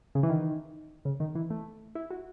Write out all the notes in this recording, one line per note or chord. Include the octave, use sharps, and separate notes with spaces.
C#3
E3
D#3
C#3
D#3
E3
A3
E4
F#4